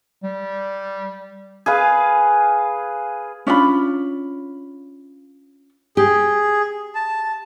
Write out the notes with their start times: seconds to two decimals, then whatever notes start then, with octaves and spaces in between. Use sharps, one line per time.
0.23 G3
1.66 G#4 B4 F5
3.47 C#4 D4 F4 B5
5.97 G4 G#4
6.95 A5